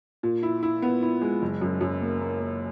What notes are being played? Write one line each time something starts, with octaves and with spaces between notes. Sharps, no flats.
A#2
E4
E4
B3
E4
G#3
F#1
F#2
F#2
A#3
A#3
A#3